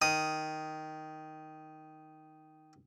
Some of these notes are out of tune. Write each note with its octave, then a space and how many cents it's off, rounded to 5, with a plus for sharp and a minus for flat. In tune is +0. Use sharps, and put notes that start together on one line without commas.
D#3 +0 D#6 +5